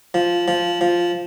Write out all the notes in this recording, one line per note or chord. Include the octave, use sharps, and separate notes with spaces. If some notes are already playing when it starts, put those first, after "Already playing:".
F3
F3
F3